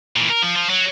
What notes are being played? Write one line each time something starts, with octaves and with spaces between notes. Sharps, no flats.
A#2 E3
A#4
F3
F3
F#3